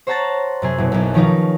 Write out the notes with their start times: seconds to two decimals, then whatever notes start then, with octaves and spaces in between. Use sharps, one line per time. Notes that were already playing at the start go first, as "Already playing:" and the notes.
0.07 C5 C#5 F#5 A5 A#5 A6
0.62 F#2 C3 G#4
0.78 F#1 B2
0.92 B1 F#2
1.14 D#3 F3 C#4 D#4 A#4 B4